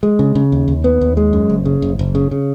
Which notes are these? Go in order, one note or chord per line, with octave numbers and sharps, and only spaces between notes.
G#3
C#3
C#3
D#2
D#2
B3
D#2
G#3
F#2
F#1
C#3
F#1
F#1
C#3
C#3